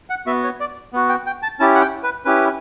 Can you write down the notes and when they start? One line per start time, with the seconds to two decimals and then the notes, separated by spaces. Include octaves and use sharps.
0.10 F#5
0.26 B3 F#4 E5
0.44 C#5
0.60 D5
0.93 B3 F#4
1.09 G5
1.26 G5
1.43 A5
1.60 C#4 E4 G4 A5
1.75 F#5
1.81 G5
2.03 B4
2.25 C#4 E4 G4 B4